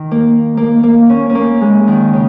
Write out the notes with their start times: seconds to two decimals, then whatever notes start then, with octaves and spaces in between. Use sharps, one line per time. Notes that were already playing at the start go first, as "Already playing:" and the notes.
Already playing: D#3
0.11 A#3
0.57 A#3
0.83 A#3
1.09 C#4
1.30 C#4
1.35 A#3
1.61 G#3
1.87 D#3
2.13 C#3